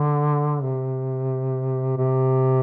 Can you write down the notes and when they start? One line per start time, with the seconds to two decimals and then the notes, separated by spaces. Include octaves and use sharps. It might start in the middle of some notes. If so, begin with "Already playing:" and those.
Already playing: D3
0.63 C3
1.97 C3